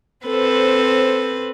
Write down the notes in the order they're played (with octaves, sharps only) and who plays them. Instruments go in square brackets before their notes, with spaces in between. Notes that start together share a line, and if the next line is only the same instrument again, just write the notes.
[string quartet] C4 A4 B4 C5